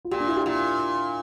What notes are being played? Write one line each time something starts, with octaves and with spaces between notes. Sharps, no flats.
F4
A#2 G4
D4
E4
G4
A#2 F4